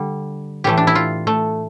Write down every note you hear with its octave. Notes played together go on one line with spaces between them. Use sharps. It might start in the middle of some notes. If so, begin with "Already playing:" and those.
Already playing: D3 G3
A2 E3 A3 G4
D4
E4
F4
A3